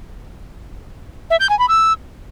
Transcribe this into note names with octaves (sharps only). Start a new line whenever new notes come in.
E5
G6
G#5
B5
E6